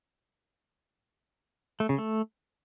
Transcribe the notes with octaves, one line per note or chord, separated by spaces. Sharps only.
A3
C#3
A3